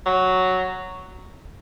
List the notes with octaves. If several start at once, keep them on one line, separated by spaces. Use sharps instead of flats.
F#3